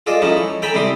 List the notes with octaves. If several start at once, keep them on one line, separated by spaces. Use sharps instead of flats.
F4 G#4 A4 D5 D#5
F3 C#4 D#4 E4 A4
C#5
A4 G5 G#5 A#5 B5
C3 G3 E4 C6 D#6